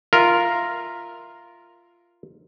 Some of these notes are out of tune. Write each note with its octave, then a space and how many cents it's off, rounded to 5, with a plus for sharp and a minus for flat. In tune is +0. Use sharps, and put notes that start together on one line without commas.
F4 -5 A#4 +0 E5 +0